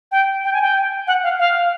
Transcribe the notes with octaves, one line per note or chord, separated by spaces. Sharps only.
G5
G5
G#5
G5
F#5
F5
F5